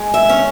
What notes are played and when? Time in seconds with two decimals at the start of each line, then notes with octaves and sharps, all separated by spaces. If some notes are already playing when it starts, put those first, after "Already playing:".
Already playing: G#3
0.14 E5
0.29 C#4